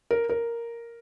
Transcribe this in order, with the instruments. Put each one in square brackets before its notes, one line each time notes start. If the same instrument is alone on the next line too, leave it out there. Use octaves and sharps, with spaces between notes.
[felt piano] A#4
A#4